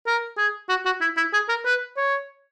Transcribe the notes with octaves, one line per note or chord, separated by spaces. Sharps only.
A#4
G#4
F#4
F#4
E4
E4
G#4
A#4
B4
C#5